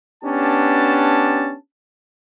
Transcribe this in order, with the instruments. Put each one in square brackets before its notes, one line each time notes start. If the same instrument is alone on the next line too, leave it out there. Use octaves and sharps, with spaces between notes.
[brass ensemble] B3 C#4 D4 G4 A5